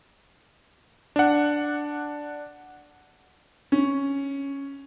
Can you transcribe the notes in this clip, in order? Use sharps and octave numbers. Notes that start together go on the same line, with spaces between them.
D4 F#5
C#4